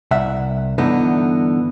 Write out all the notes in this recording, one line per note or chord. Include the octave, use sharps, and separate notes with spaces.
C2 E5 F#5
G2 D3 E3 B3 D#4